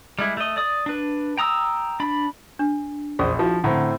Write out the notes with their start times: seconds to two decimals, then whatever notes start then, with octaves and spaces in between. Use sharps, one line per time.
0.19 G3 G#3 E4
0.37 A3 D#5
0.57 D5 D#6
0.86 D4 B4
1.37 G5 A#5 D#6 E6
2.00 D4 B5
2.59 D4
3.19 A#1 E2 C#4 F4 G#4 C5 D5 D#6
3.39 F3 E4 F#4
3.64 A2 D3 C4 F#5 A#5